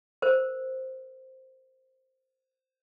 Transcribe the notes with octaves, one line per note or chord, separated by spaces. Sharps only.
A#4 C5